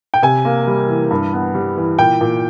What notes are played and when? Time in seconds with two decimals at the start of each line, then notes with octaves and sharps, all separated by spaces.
0.14 G5
0.23 C3 G#5
0.45 A#3
0.67 G3
0.89 E3
1.11 G2
1.33 B3
1.55 G3
1.77 E3
1.99 A#2 G5
2.21 A#2